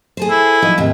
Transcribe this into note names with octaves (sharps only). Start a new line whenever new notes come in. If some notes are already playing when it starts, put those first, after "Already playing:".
G#4 A4 C5
E4
F3 F#3 D#4
D#2 G#2 C3